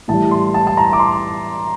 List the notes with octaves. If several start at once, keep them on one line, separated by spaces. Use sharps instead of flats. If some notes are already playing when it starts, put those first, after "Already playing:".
A2 E3 G3 A5
C6
A5
A5
A#5
D6
C6